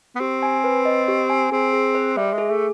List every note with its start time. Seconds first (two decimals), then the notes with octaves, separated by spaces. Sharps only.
0.15 B3
0.20 C4 G4
0.43 G#5
0.64 B4
0.85 D#5
1.08 G4
1.30 G#5
1.52 C4 G#4
1.73 G#4
1.95 C5
2.17 G3 E5
2.33 G#3 G#4
2.50 A3